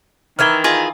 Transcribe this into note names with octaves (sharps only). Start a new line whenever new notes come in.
D#3 E3 A#4 E5 F6 G#6 G7
F4 G#4 D#5